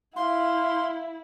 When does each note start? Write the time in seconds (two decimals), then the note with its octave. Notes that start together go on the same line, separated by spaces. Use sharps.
0.16 E4 F5 C6